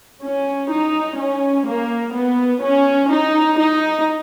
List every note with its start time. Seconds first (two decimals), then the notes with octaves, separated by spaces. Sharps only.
0.22 C#4
0.70 D#4
1.18 C#4
1.67 A#3
2.15 B3
2.62 C#4
3.10 D#4
3.59 D#4